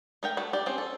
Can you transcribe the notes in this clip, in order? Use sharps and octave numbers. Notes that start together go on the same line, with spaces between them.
A3 A#4 G5
A3 F#4
G4 D5
C4 C#4 C5
A4